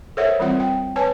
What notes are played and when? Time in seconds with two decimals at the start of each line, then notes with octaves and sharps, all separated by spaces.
0.17 A4 A#4 C5 C#5 E5 F#5
0.39 E3 G3 C4 F4 F#5
0.60 G5
0.96 B4 C#5 G#5 A5